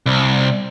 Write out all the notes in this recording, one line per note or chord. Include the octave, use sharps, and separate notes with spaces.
C2